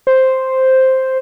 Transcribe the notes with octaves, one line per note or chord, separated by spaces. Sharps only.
C5